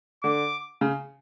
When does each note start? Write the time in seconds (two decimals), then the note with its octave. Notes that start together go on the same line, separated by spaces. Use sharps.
0.23 D3 D6
0.81 C#3